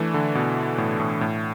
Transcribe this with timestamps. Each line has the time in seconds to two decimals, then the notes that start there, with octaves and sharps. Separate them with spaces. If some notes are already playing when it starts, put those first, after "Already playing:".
Already playing: E3 A3 D4
0.14 D3
0.35 B2
0.78 A2
1.00 A2
1.21 A2